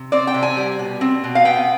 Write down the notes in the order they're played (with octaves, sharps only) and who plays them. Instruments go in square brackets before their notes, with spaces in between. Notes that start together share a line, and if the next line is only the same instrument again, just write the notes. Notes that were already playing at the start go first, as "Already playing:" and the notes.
Already playing: [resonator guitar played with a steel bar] C3
C4 D5
G5
C3
G#5
G3
B2
C4
B2
F5
B3 G5